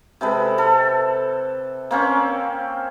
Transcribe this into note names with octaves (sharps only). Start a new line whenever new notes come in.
C3 G#3 A4 B4
A4
A#3 C4 C#4